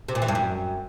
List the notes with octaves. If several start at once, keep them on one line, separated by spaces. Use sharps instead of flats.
C3
A#2
E3
G2
F#2